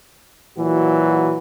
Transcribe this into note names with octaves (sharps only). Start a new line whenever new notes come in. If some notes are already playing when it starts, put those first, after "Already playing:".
A#2 E3 F#3 F#4